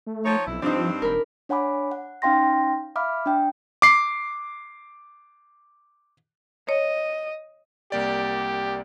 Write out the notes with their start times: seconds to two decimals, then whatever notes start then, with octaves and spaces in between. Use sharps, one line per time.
0.07 A3
0.24 F3 D#4 C#5
0.47 B1 F2 E4
0.62 G2 F3 C4 D4 D#4
1.02 E1 A#4 B5
1.49 D4 C#5 F#5 G#5 B5 D6
1.91 F#5
2.22 C#4 D#4 F5 G5 C6 A#6
2.96 E5 F5 B5 D6 F6
3.26 D4 G5
3.82 D6 C7
6.69 C#5 D#5
7.92 C2 A#3 G4 D5